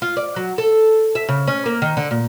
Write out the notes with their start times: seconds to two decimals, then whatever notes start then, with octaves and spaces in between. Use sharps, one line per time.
0.02 F4
0.17 D5
0.36 F#3
0.58 A4
1.15 E5
1.29 C#3
1.47 C#4
1.66 A#3
1.82 D#3
1.97 D3
2.11 A#2